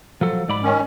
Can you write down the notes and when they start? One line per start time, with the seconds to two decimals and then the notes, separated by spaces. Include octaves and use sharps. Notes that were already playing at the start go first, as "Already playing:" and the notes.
0.21 F3 F#3 A4
0.49 G#2 D5 B5
0.63 D#3 C#4